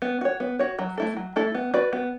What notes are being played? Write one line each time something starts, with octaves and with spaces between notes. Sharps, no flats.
B3
F#4 C#5
B3
F#4 C#5
F#3
A3 E4 A4
F#3
A3 E4 A4
B3
F#4 B4 D5
B3